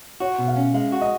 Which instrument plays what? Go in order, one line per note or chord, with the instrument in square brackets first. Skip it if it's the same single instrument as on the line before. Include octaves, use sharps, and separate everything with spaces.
[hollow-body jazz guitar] F#4 [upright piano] C#5
[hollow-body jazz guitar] B2
[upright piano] F5
[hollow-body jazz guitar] C#4
[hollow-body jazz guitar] G#3 [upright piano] F5
[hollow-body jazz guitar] F#4
[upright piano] D#5